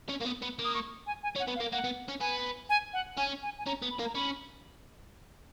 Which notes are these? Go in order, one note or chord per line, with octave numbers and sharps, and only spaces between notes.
C#4
A#3
B3
B3
A#3
D#6
C#6
G#5
G#5
C#4
F#5
B3
F5
A#3
A#3 F#5
B3
C#4
B3 G#5
G#5
F#5
C#4 G#5
G#5
G#5
C#4 A#5
B3
B5
A#3
A#5
C#4 B5